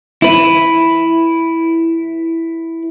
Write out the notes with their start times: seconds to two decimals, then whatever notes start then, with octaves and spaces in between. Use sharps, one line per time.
0.22 E4 B4